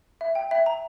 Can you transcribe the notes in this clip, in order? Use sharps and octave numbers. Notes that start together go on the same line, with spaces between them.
E5
G5
E5
A#5